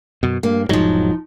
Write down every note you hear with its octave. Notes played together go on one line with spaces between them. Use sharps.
F#2 B2
G2 A#3
E1 G#2 F3 F#3 D#4